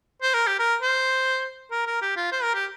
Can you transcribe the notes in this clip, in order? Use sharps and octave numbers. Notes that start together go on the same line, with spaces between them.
C5
A#4
G4
A#4
C5
A#4
A#4
G4
F4
C5
A#4
G4